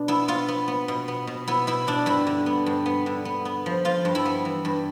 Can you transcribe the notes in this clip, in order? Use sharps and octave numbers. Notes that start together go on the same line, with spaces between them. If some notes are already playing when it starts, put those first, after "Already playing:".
Already playing: B2 D4
B3 E4
B3 F4
B3
B3
B2
B3
B2
B3 E4
B2 E4
B2 D4
G2 E4
D3
B3
G2
B3
D3
B3
B3
F3
F3 F4
G2
E4
B3
E3
G2